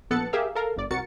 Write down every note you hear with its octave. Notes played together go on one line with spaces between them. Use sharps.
A#1 B3 A4 F#6 A6 C#7
G4 G#4 A#4 E5 F5
A4 A#4 F5
G1 D5
C2 F#4 A#4 A6 C#7